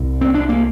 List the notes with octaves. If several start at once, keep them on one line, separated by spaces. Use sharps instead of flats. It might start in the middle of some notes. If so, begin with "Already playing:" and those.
Already playing: C2 C3
C4
D4
A#3